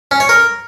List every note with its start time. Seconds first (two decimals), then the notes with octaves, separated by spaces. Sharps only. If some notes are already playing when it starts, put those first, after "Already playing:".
0.11 C#4
0.20 C#5
0.29 A#4